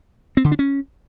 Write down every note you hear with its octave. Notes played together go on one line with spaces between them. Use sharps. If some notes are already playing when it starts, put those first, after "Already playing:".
C4
D3
D4
C#4